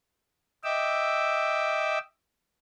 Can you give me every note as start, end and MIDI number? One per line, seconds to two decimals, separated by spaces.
0.64 1.99 75
0.64 1.99 76
0.64 1.99 79
0.64 1.99 86
0.64 1.99 88